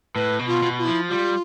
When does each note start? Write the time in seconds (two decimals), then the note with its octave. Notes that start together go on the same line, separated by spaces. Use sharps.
0.15 A2 B4
0.39 B2
0.47 F4
0.63 B2
0.79 F4
0.84 F3 E4
1.09 G3 F4